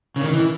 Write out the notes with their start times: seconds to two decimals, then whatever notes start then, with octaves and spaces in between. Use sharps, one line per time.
0.16 C#3
0.21 D#3
0.33 E3